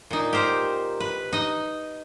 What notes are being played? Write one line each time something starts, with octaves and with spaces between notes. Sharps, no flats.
A#2 D#4
G4 A#4 C5 G5
B4
D#4 D#5